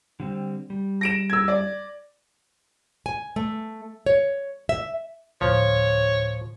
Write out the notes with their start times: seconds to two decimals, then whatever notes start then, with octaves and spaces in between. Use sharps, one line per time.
0.20 D3 G3 C4
0.70 G3
1.01 A#6 D7 E7
1.30 E6 G#6
1.48 D5
3.06 G#5
3.36 A3
4.06 C#5
4.69 E5
5.41 D2 A2 F3 C#5